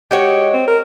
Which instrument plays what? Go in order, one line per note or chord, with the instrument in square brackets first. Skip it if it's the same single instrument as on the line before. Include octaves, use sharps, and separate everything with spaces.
[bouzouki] G#3 F#4 C#5 [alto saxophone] G4
[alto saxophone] C4
A#4